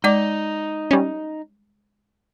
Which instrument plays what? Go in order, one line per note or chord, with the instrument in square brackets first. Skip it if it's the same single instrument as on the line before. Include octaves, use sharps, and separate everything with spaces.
[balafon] G#3 D5 D6 [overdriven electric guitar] D#4
[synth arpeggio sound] G3 C#4